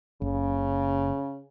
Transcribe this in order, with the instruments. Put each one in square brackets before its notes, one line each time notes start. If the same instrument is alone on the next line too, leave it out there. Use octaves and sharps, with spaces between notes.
[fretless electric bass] F#1 [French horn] C#3